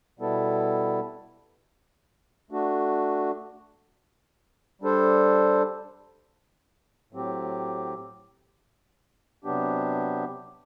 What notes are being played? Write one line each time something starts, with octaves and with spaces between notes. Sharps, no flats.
B2 G3 B3 E4 A4
A3 D4 F#4
G3 D4 A4 C5
A2 F#3 C4 G4
C3 F#3 B3 D4 G4